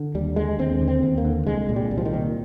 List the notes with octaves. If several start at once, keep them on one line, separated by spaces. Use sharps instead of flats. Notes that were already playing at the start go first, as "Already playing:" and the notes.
Already playing: D3
D#2 G3
D3 G#3
D#2 C4
D3
C4
D#2
A#3
D3
C2 G#3
A#2
G3
C2
F3
D#3
A#2